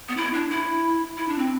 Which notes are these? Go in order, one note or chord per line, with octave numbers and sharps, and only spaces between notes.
B3
E4
D4
E4
E4
D4
C4